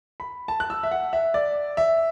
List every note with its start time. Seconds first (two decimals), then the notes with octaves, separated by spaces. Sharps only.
0.20 B5
0.48 A5
0.60 F#6
0.70 E6
0.83 E5
0.91 F#5
1.13 E5
1.34 D5
1.77 E5